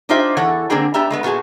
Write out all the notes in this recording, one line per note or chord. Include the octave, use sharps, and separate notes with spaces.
D4 D#4 F4 G4 C5 E5
E2 E3 A4 C#5 F#5
D3 A#3 C4 D4 G#4 A#4
B3 D4 G4 E5 A#5
G#3 A3 B3
A#2 B3 F#4 G#4 A5